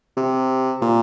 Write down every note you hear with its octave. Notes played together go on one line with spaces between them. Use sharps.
C3
A#2